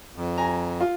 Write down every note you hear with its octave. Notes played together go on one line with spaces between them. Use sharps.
F2
G#5 A#5
F4